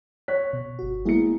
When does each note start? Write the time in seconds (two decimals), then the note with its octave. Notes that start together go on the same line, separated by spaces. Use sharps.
0.28 C#5 F#6 B6
0.53 B2
0.79 G1 F#4
1.05 G#3 A#3 B3 E4 G#4 C#7